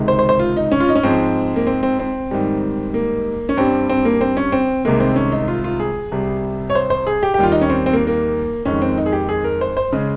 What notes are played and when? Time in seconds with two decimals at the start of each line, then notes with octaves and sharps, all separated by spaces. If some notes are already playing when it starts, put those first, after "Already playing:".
Already playing: C#2 C3 D#3 G#3
0.08 C5
0.19 C5
0.29 C5
0.39 F4
0.57 D#4
0.72 C#4
0.80 F4
0.89 D#4
0.96 C#4
1.03 G#2 F3 G#3 C4
1.56 A#3
1.67 C4
1.83 C4
1.99 C4
2.31 G#2 D#3 G3
2.94 A#3
3.49 C#4
3.57 G2 G3 C4
3.89 C4
4.05 A#3
4.21 C4
4.37 C#4
4.52 C4
4.85 C2 C3 D#3 G#3 A#3
5.00 C4
5.16 C#4
5.32 D#4
5.48 F4
5.64 F4
5.80 G#4
6.12 C2 C3 G3
6.70 C#5
6.75 C5
6.90 C5
7.07 G#4
7.23 G4
7.34 G4
7.38 D#2 D#3 G3 F4
7.52 D#4
7.62 C#4
7.70 C4
7.86 C4
7.93 A#3
8.07 A#3
8.65 F2 D#3 G#3 C#4
8.82 C4
8.98 D#4
9.06 G#4
9.12 G4
9.29 G#4
9.44 A#4
9.61 C5
9.77 C5
9.92 C#3 G#3